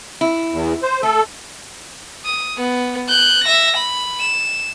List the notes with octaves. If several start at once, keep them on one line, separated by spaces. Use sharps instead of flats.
E4
E2
C5
A3 A4
D#6
B3
F#6 G6
E5 A#6
B5
E7